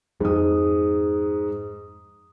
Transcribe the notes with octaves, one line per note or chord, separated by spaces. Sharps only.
F2 G#2 D#6